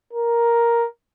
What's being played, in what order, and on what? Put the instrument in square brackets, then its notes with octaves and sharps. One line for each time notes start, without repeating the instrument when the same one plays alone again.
[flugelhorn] A#4